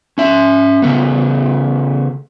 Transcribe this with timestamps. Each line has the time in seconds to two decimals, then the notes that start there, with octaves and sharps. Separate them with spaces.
0.18 C#4 E5
0.82 C#3 A3 B3